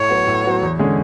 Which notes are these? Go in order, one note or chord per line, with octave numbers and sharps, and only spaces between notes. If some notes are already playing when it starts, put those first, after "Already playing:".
Already playing: A2 C#5
F#3 B3 F#4
A2
F#3 B3 F#4
E2
D3 G#3 C#4 G#4